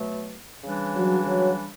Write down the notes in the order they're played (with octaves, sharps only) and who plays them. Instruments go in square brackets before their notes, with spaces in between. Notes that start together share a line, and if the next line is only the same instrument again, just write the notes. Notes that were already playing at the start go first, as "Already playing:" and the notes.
Already playing: [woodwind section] B2 F#3 A3
C#3 E3 G3 D4
[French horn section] F#3
F#3